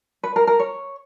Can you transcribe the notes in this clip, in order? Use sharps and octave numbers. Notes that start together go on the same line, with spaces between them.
B4
A#4
A#4
C#5